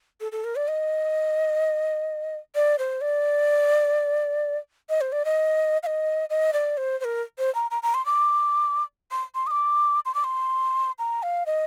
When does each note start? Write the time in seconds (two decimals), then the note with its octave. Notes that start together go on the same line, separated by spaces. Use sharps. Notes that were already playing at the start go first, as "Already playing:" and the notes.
0.21 A4
0.32 A4
0.44 A#4
0.56 D5
0.68 D#5
2.55 D5
2.79 C5
3.01 D5
4.90 D#5
5.01 C5
5.12 D5
5.25 D#5
5.83 F5
5.86 D#5
6.30 D#5
6.53 D5
6.77 C5
7.00 C5
7.05 A#4
7.39 C5
7.55 A#5
7.71 A#5
7.83 A#5
7.94 C6
8.06 D6
9.11 C6
9.35 C6
9.47 D#6
9.51 D6
10.06 C6
10.14 D6
10.24 C6
10.99 A#5
11.23 F5
11.46 D#5